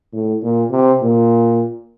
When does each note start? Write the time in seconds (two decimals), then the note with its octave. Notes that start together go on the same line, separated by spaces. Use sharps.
0.13 A2
0.43 A#2
0.71 C3
1.02 A#2